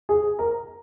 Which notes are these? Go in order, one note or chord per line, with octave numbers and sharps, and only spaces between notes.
G#4
A#4